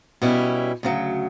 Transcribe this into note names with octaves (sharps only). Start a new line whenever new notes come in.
B2 G3 C#4 E4
D2 C#3 F#3